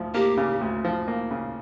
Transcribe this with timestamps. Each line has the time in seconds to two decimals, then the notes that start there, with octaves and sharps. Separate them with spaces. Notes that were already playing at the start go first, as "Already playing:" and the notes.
Already playing: D2 F3
0.14 A#3 G4
0.37 C#3
0.61 D2
0.85 F3
1.08 A#3
1.31 C#3